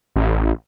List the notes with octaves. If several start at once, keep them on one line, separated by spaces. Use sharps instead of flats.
A1